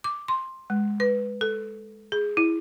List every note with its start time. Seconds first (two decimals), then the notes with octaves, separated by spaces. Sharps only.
0.04 D6
0.28 C6
0.70 G#3
1.00 B4
1.41 A4
2.12 G#4
2.37 E4